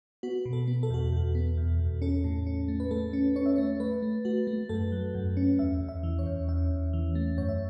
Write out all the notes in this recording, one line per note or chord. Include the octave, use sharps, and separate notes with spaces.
B3 F#4
B2
A4
B3
A4
E2 F#4
E2 F#4
B3
E2
E2
C#4 A4
A2
C#4
A3
B4
A3 A4
C#4
C#4 C#5
E5
A3 C#5
A3 B4
A3
A3 F#4
A3
F#2 A4
F#3
F#2
C#4
E2 E5
E2
E5
E3
C#5
E2
E2 E5
E2
E3
A3
F#2 C#5
E5